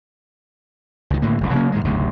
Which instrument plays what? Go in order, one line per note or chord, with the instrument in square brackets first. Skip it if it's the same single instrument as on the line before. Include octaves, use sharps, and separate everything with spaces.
[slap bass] C#2 D#3
A2 D3 A#3
F#1 C2
C#3 F#3 A#3 C#4
G#2 D#3 G#3
F#1 D2 G#2 C3